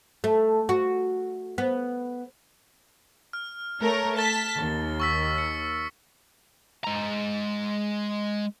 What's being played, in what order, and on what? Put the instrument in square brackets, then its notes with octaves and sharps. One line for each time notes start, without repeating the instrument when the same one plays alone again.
[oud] A3
F#4
B3
[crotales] F6
[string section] A3 A#4 C#5
[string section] A5 B6 [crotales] A6 G7
[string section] D#2
[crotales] C#6 E6 B6
C#7
[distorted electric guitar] G#3 A#5